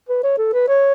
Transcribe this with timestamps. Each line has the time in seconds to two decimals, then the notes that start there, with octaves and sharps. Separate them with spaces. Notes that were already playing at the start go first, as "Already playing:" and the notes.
0.09 B4
0.24 C#5
0.38 A4
0.53 B4
0.68 C#5